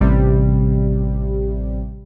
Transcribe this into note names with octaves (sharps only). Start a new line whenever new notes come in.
A1 C3 G3